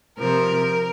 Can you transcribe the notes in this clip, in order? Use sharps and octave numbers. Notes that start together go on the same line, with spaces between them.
C3 F3 A#4